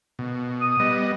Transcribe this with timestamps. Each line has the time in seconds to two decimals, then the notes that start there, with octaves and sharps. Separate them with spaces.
0.19 B2
0.61 D#6
0.80 G3 B3 D#5